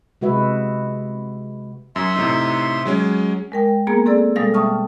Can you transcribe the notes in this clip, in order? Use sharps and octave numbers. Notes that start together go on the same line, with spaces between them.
C3 G#3 F#4 B4 E5
F#2 E5 C6
A2 C3 D#4
F#3 G#3 C#4
G#3 A#4 G5
A#3 B3 G#4 A#4 G#5 A#5
C4 G#4 A4 D5 E6
B2 G3 G#3 A4 F5 A6
E5 G5 A5 C#6 D#6 F6